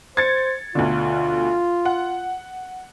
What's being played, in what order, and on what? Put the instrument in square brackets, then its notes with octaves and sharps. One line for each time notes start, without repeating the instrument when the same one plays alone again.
[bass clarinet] C5 [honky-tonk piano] G#6 A6 C#7
[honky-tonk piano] D2 B2 D3 [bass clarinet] F4
[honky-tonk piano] F#5